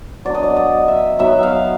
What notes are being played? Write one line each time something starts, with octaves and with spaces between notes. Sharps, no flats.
F#3 B3 D4 D5
D#5
D5
D#5
E5
F#3 B3 D#4 E5
F5